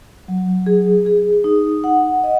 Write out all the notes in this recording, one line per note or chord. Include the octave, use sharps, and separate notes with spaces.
F#3
G#4
G#4
D#4
F#5
D#5